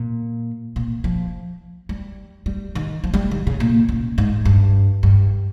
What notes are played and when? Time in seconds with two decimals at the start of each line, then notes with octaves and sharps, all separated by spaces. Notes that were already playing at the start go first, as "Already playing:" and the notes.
Already playing: A#2
0.76 A#2
1.04 F3
1.89 G3
2.46 G3
2.75 D#3
3.04 F3
3.14 G3
3.31 D#3
3.47 C#3
3.60 A#2
3.89 C#3
4.18 G#2
4.45 G2
5.03 G2